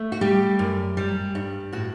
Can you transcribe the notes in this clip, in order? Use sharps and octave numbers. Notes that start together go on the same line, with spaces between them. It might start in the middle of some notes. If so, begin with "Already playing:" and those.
Already playing: A3
F#4
G3 G4
F#2
G3
G2
A2 F#4